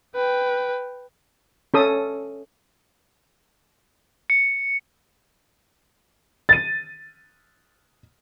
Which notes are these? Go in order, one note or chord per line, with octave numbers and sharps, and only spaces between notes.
B4 G5
C#4 A4 D#6
C#7
A6 D#7